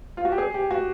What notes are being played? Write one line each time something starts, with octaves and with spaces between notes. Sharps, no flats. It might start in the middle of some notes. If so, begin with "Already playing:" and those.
F4
F#4
G4
G#4
G4
F#4